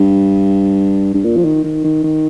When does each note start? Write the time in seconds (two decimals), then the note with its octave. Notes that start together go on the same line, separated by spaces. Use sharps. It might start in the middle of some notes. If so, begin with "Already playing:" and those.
Already playing: G2
1.14 G2
1.24 A#2
1.37 F3
1.44 D#3
1.64 D#3
1.84 D#3
2.04 D#3